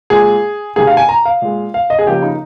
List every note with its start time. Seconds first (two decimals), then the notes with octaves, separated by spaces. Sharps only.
0.10 A#2 G#3 G#4
0.76 C3 D#3 A#3 G#4
0.87 F5
0.97 G#5
1.09 A#5
1.25 F5
1.42 A#2 G#3
1.74 F5
1.90 D#5
1.99 G#4
2.06 C#3 F3 A#3 G4
2.22 D#4